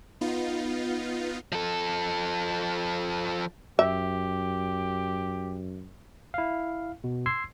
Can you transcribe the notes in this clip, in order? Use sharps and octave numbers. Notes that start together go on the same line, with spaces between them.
B3 D#4 F4
F3 A4
F#2 G4 E5
E4 F5
B2
C6 E6 G#6 C7